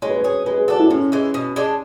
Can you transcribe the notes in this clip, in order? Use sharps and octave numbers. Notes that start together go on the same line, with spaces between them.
G#3 C#5
B4
C#5
C#4 G#4
G#3 B4
G#4
D4 F#4 A4
E4
A2 C#4
E3 G#3
B2
G#3 D4